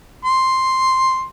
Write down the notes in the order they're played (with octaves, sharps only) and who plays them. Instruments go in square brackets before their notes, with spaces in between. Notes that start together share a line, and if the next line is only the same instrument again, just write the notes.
[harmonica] C6